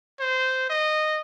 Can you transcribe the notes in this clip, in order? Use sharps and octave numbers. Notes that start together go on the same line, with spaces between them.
C5
D#5